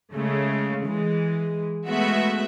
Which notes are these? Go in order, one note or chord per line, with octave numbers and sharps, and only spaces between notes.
C#3 G#3 A3
E3 G#3
G#3 A3 B3 F#4 E5